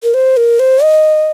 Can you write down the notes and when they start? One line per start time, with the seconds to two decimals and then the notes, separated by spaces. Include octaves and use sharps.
0.03 A#4
0.14 C5
0.37 A#4
0.59 C5
0.83 D#5